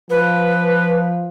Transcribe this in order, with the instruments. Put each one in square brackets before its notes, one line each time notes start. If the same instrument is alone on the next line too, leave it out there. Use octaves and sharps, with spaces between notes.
[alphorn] F3 [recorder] B4